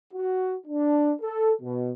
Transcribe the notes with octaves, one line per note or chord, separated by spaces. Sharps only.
F#4
D4
A4
B2